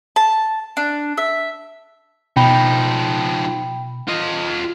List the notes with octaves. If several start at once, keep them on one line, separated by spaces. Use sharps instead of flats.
A5
D4
E5
B2 F3 D#4 G5 B5
F4 D#5